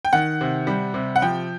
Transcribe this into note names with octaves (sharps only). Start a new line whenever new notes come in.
G5
D#3 F#5
C3
G3
C3
F#5
F3 G5